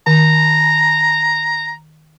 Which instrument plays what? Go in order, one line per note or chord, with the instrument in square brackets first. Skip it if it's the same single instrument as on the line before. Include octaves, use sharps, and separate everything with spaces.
[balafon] D#3 [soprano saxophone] A#5